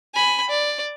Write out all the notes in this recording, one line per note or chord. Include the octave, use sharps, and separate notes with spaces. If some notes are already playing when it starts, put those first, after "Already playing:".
G#5 B5
D5